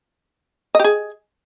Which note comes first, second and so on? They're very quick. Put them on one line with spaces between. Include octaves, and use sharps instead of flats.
D#5 G4 G#4